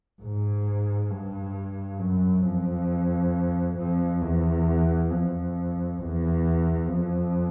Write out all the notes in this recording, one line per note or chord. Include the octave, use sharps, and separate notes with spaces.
G#2
G2
F#2
F2
F2
E2
F2
E2
F2